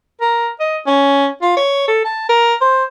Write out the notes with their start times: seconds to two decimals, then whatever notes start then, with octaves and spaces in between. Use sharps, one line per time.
0.21 A#4
0.60 D#5
0.87 C#4
1.42 F4
1.57 C#5
1.88 A4
2.05 A5
2.29 A#4
2.61 C5